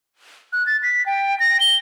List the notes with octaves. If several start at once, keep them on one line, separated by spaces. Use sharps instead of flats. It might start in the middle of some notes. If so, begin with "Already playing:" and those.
F#6
A6
B6
G5
A#6
G7